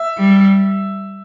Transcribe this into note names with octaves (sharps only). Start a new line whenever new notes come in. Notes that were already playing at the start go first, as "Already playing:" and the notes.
Already playing: E5
G3